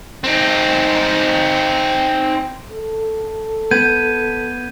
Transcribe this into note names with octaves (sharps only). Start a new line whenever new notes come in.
C4 D#4
A4
B3 G6 G#6 D#7